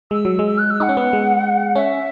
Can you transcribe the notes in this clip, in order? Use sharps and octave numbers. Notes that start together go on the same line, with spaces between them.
G#3 E6
F#3
G#3
E6
F#6
E6
D#4 F#5
C#4
B3
G#3
C#4 E5